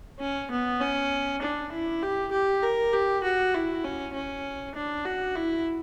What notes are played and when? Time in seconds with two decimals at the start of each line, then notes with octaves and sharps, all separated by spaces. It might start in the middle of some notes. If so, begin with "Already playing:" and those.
0.20 C#4
0.51 B3
0.81 C#4
1.42 D4
1.72 E4
2.03 G4
2.32 G4
2.63 A#4
2.93 G4
3.24 F#4
3.54 E4
3.84 C#4
4.14 C#4
4.75 D4
5.05 F#4
5.36 E4